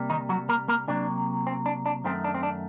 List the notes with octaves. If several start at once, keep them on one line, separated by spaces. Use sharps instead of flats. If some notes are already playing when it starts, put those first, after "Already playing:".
Already playing: C3 G3 A#3
D#3 D#4
F#3 F#4
A#3 A#4
A#3 A#4
C3 F#3 A#3 D4
C4
D4
D4
F#2 D#3 A3 C4
D4
C4
D4